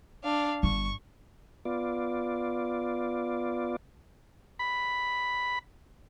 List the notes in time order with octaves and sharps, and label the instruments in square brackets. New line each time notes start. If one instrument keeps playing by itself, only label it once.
[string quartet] D4 F5
[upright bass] G1 [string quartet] C#6
[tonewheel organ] B3 F4 D5
[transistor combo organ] B5